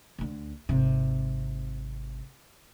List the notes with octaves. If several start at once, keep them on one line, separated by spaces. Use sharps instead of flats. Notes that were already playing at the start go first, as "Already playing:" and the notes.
D2 D3
G#1 C3